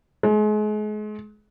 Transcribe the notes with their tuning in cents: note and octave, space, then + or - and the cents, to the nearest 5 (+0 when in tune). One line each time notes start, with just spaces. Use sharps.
G#3 +35